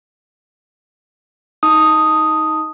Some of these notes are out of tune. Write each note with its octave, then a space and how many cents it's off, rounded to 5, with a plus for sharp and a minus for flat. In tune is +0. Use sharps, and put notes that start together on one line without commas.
D#4 +15 A5 +20 D#6 +0